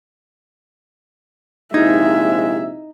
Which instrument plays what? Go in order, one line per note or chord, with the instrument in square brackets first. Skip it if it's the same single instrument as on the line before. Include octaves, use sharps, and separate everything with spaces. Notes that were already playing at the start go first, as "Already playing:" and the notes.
[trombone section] A#1 C3 G#3 [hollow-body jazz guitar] D#4 [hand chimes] E4 G#6 [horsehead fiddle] E5